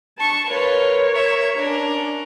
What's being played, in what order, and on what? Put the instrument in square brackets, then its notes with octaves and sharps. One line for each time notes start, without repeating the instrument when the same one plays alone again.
[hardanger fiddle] D4 C#6 [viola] A5
[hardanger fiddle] F4 B4 [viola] A#4 C#5
[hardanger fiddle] E5
[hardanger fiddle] C#4 A#4 [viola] D4